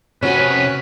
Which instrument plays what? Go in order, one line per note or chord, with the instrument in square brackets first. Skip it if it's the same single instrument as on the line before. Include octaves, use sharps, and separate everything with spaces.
[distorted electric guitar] C3 G#5 [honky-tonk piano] C#4 F#4 [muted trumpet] B4